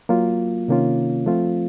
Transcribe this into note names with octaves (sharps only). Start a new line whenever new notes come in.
F#3 A#3 F4
C3 D#3 A#3 C#4 F4
F3 A3 C4 F4